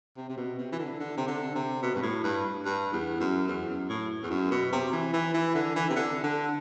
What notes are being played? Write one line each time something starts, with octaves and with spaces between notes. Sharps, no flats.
C3
C3
B2
C3
E3
D3
D3
C3
D3
C3
B2
G2
A2
G2
G2
E2
F#2
E2
F#2
A2
E2
F#2
B2
C3
E3
E3
E3
D3
E3
C3
D3
D3